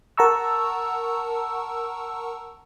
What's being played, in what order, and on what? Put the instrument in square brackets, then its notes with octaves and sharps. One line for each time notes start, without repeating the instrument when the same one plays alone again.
[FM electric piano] A#4 F#5 A5 A#5 C#6 E6